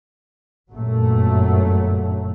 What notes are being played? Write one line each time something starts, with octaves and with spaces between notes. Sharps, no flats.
G1 F#2 A#2 F#3 A3